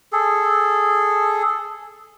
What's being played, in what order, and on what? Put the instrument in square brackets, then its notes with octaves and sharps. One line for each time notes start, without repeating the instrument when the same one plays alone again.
[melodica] G#4 A4